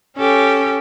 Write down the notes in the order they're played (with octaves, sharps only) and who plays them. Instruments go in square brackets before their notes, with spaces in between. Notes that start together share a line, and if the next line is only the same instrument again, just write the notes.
[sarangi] C#4 [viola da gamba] G4 A4